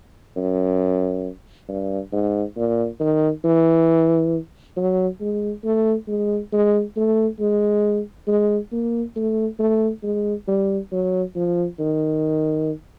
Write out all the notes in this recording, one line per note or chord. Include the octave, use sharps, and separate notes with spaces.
F#2
G2
G#2
A#2
D#3
E3
F#3
G#3
A3
G#3
G#3
A3
G#3
G#3
A#3
A3
A3
G#3
G3
F#3
F3
D#3